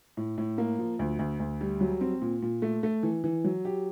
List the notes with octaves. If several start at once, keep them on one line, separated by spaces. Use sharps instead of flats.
A2
A2
A#3
F3
D2
D2
D2
G3
F#3
C4
A#2
A#2
A3
A3
E3
E3
F#3
G4